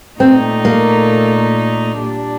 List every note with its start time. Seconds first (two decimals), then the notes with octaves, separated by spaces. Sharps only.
0.20 A#2 A3 C4 D#4
0.65 A#3
2.00 A#2 G3 D4